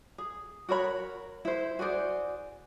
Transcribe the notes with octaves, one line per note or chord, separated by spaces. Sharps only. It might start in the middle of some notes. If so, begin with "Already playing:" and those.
G#4
F#4 A#4 C#5 B5
E4 C5
F#4 G#4 C5 D5